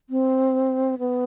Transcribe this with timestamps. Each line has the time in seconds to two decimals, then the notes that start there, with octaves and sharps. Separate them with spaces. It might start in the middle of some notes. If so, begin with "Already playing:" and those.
0.10 C4
0.99 B3